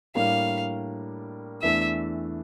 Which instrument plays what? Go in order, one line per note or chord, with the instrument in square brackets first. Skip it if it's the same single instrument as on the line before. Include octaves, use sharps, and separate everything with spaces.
[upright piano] A2 G3 A#3 D4 [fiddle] F5
[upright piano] E2 E3 A3 D4 [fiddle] E5